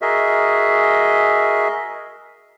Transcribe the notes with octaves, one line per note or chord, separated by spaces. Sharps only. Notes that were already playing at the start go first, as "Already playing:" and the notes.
F#4 G#4 A#4 D#5 E5